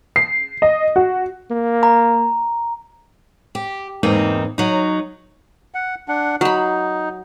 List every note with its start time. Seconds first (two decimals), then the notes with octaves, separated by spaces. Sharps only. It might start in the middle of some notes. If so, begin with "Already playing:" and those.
0.16 C7
0.62 D#5
0.96 F#4
1.51 A#3
1.83 A#5
3.55 G4
4.03 E2 G#2 A#3 C4 D#4
4.58 F#3 D#4
5.74 F#5
6.08 D4 F#5
6.41 F#3 D#4 B5